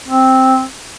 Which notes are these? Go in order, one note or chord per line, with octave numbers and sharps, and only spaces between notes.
C4